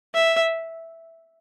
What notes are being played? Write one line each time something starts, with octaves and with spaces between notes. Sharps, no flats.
E5